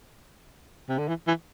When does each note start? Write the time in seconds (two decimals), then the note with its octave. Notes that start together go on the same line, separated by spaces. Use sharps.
0.89 C3
0.98 D3
1.08 E3
1.27 E3